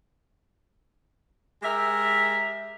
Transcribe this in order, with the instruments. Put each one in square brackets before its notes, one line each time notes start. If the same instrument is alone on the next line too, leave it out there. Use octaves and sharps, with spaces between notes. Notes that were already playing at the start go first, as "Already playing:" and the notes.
[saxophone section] G#3 G4 A#4 E5